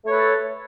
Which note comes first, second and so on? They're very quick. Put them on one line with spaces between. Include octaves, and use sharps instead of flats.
A3 C#5 B4 A4